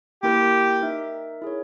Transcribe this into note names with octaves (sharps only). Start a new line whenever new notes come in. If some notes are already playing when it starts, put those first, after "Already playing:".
A#3 E4 G4 A#4
D#4 A#4 E5
E4 G#4 C#5